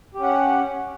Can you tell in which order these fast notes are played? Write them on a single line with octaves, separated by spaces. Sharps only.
G4 C#4 F#5